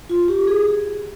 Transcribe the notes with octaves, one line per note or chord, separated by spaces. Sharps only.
F4
G4
G#4